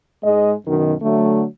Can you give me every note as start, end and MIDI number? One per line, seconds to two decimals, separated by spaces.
0.24 0.53 44
0.24 0.53 56
0.24 0.53 75
0.67 0.95 42
0.67 0.95 47
0.67 0.95 51
1.02 1.46 50
1.02 1.46 54
1.02 1.46 57